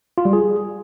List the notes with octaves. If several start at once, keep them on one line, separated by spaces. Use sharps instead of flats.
F4
G3
G#4